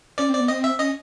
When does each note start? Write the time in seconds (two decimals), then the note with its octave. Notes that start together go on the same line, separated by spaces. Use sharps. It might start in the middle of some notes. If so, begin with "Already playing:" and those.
0.18 C#4 D5
0.29 C4 D5
0.40 B3
0.48 C4 D#5
0.64 E5
0.79 C#4 D#5